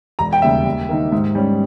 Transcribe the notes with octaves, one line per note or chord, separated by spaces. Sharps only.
E1 A#5
G5
D#2 C#3 G3 E5
D#2
D#3 A#3 D#4
G#2
G3 C#4